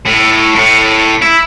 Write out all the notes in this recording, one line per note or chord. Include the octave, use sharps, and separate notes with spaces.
A2
A2
E4